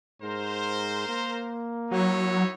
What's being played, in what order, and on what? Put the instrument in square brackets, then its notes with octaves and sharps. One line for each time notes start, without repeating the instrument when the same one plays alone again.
[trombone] G#2 [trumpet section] A#4 C5
[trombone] A#3
[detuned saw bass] F#3 [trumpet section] D#4 E4 C#5